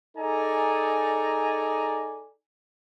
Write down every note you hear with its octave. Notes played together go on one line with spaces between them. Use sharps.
D#4 G#4 A4 D5 G#5 A#5